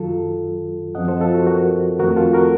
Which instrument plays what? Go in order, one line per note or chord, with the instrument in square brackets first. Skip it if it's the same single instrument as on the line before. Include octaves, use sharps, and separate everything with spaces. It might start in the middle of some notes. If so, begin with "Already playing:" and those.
Already playing: [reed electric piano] F#2 D#3 F#3 F4 A4
F#2 F3 C4 D#5 F#5
A4 C5
F4 A4
F#4
F#4 A#4
F2 D#3 A3 C4 F#4 A#4
F4 A4
F#4 A#4